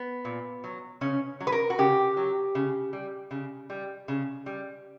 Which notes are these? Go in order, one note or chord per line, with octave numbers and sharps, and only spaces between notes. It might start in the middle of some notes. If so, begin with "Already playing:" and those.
Already playing: B3
A#2
F#3
C#3 C#4
F#3
B4
A#4
F#4
C#3 G4
F#3
C#3
G3
C#3
G3
C#3
G3